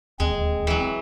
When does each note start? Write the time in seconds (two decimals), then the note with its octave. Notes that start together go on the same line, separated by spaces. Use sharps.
0.20 D1 D#2 G#3 C4
0.67 E3 F#3